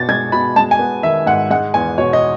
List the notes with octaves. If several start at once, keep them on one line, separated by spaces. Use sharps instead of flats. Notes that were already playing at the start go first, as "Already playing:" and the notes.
Already playing: B2 B3 A6
G#3 G#6
B2 B5
G#3 A5
G#5
B3
D#3 E5
G#2 F#5
G#3 F#5
E2 G#5
B2 C#5
D#5